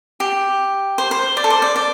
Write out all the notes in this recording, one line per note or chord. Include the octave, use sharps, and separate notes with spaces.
G4
C5
C5
D5
A4
C5
D5
D5